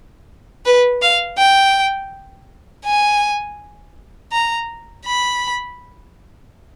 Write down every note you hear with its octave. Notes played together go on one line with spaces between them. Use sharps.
B4
F5
G5
G#5
A#5
B5